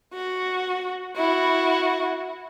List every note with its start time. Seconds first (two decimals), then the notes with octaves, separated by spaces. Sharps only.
0.13 F#4
1.16 E4 F#4